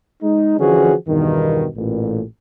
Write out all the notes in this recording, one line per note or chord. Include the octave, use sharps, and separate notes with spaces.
G#3 D#4
D3 E3 F3 C#4 F#4 G#4
E2 G2 B2 D#3
A1 A#2